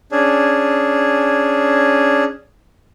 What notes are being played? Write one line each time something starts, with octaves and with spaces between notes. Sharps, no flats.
C#4 D4 G#4